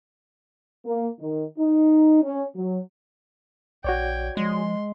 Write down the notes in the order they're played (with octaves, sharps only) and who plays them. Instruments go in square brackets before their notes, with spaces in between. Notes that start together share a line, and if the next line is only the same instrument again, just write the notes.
[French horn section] A#3
D#3
D#4
C#4
F#3
[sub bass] A#1 [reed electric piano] F#4 C#5 D5 [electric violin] G5 G#6
[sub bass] F3 [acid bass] G#3 [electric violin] C6